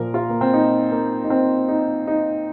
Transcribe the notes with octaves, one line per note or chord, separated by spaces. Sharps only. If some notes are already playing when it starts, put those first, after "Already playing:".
Already playing: A#2 F3 A#4
F4
A#3
C4
D#4
A#3
D#4
C4
D#4
D#4